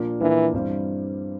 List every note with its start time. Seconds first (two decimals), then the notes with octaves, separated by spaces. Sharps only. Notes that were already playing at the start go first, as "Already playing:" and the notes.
Already playing: A#2 F3 A#3 D4
0.21 A#2 E3 F3 A#3 D4
0.53 G2 E3 G3 C4